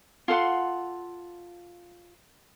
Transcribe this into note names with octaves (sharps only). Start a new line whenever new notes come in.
F4 A4 F#5 C6